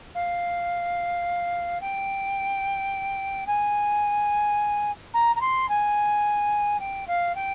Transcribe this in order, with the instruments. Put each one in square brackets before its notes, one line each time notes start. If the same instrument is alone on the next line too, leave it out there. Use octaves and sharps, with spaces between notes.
[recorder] F5
G5
G#5
A#5
A#5
C6
G#5
G5
F5
G5